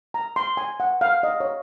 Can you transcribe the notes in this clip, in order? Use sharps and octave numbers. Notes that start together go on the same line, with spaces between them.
A#5
C6
G#5
F#5
F5
D#5
C#5